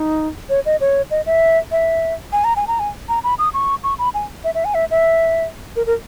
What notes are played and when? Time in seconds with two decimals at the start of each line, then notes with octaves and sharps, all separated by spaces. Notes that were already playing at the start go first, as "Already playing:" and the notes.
Already playing: D#4
0.49 C#5
0.66 D#5
0.81 C#5
1.11 D#5
1.26 E5
1.71 E5
2.33 G#5
2.44 A#5
2.56 G#5
2.67 A#5
2.79 G#5
3.09 A#5
3.24 B5
3.39 D#6
3.54 C#6
3.84 C#6
3.99 B5
4.14 G#5
4.44 E5
4.55 E5
4.65 G#5
4.74 E5
4.91 E5
5.76 A#4
5.86 A#4